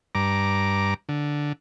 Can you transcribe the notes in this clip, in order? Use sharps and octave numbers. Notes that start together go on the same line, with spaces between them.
G2 A#5 D6
D3